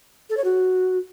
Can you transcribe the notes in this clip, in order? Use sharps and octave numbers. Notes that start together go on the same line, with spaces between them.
A4
C#5
F#4